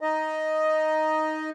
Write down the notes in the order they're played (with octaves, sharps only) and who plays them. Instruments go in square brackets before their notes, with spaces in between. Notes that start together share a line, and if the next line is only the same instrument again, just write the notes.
[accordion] D#4 D#5